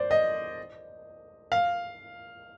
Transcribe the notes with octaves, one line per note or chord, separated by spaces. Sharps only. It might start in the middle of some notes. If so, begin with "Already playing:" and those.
Already playing: C5 D5
D#5
F5